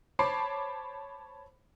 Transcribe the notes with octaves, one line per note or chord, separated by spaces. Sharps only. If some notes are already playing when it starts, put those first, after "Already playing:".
C5 C#5 A5 B5 D6 C7